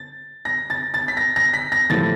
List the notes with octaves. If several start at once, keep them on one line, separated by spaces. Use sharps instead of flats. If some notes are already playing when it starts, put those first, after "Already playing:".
Already playing: A6
A#6
A6
A6
B6
A#6
A#6
B6
A#6
A1 A2 F3 A3 A6